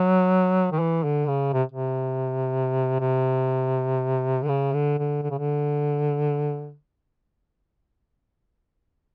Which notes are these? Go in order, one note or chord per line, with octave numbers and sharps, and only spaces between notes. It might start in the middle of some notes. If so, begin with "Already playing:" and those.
Already playing: F#3
D#3
E3
D3
C#3
C3
C3
C3
D3
C#3
D3
D3
D3
C#3
D3